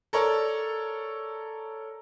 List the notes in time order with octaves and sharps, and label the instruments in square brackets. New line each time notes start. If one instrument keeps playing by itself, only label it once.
[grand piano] A4 A#4 C#5 D5